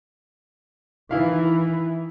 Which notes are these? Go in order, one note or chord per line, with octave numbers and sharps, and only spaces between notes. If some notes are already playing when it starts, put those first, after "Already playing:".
D#3 E3 E4 F5